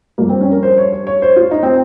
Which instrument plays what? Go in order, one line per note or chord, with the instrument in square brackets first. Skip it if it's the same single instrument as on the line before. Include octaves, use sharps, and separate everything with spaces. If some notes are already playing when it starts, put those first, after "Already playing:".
[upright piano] G2 F3 A#3
C4
C#4
A#4
C5
C#5
C#5
C#5
C5
F4
D#4
C4